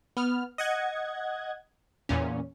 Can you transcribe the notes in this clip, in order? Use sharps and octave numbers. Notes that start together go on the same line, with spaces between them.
B3 F6
D#5 F#5 G#6
E2 A#2 C#4